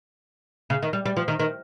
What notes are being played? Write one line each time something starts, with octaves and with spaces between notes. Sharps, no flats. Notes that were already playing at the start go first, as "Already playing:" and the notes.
C#3
D#3
G3
G3
F3
D#3
D#3